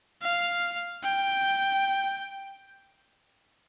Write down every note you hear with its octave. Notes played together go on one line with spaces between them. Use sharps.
F5
G5